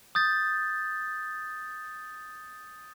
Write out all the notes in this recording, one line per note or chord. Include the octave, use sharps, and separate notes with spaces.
D#6 G6 A6